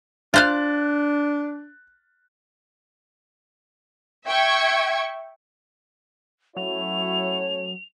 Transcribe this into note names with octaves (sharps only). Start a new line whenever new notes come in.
D4 F4 C5 F5 F#6 A6
E5 G5 C#6 G#6
F#3 A3 C#4 E4 F#4 C#5 F7